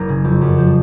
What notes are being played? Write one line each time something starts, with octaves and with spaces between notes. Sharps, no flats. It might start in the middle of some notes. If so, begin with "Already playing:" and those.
Already playing: F#1 A#5
C#3
F2
F#2
F3